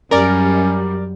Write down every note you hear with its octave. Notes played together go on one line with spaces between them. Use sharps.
F#2 G3 C#4 A#4 D5